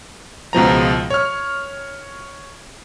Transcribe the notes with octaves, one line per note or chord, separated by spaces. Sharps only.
C#2 B2 F3 A#5
C#5 F6